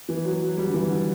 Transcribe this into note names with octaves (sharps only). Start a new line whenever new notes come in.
E3
F#3
F#3
G3
D3
E3
D3